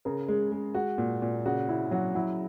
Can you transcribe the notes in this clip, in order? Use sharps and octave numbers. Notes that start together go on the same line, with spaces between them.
C#3 A#4
G#3
G#3
G#3 F#4
A#2
A#2
C#3 F#4
C#3 E4
F#3 F#4
F#3 E4